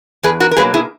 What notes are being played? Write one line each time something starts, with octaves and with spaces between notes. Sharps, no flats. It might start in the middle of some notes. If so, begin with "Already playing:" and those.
E2 G#4 B4
F#4 A#4
A#4
B2 F#3 A#3 G#4 B4
E4 G#4